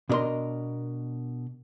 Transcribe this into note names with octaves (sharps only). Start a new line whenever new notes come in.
B2 D4 E4 A#4 D#5 C6